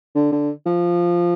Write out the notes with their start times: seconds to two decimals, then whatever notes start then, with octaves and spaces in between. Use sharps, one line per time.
0.15 D3
0.32 D3
0.66 F3